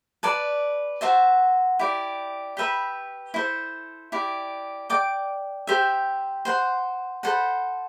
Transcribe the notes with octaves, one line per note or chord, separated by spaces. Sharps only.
B4 D5 A5
F#4 C5 E5 A5
E4 G4 D5
G4 B4 E5 B5
E4 A4 C5
E4 G4 D5
D5 G5 D6
G4 C5 E5
C5 F#5 C6
A4 C5 F#5 B5